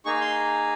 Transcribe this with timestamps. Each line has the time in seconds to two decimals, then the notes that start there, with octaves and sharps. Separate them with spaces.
0.05 A#3 D#4 G#4 C#6
0.21 C6